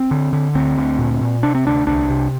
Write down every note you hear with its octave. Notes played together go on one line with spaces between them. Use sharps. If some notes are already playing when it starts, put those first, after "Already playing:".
Already playing: C4
D3
D3
D2 C4
D2
A#2
A#2
C3 D4
C4
D2 D4
C2 D4
C3